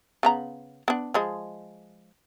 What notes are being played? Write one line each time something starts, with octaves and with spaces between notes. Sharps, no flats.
C#3 B3 A#5
B3 D4
F3 G#3 D#5